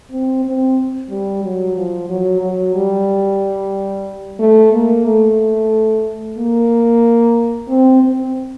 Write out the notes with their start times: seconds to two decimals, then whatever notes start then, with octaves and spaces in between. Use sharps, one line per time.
0.11 C4
0.45 C4
1.09 G3
1.44 F#3
1.76 F3
2.09 F#3
2.41 F#3
2.75 G3
4.39 A3
4.73 A#3
5.05 A3
6.37 A#3
7.69 C4
8.02 C4